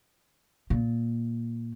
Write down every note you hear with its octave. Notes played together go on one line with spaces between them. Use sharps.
A#2